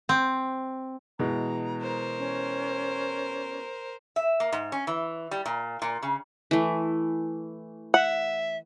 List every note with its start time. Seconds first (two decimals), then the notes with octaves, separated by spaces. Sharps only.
0.09 C4
1.19 B2 E3 G#3 A#5
1.81 A#4 C5
2.19 C#4
4.16 E5
4.40 A#3
4.52 G#2
4.72 C#4
4.87 E3
5.31 G3
5.46 A#2
5.82 A#2
6.02 C#3
6.51 E3 A3
7.94 E5 F#5